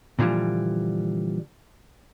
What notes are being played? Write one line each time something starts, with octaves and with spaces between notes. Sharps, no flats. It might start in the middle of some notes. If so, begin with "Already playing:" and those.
A#2 D3 E3 F3 G3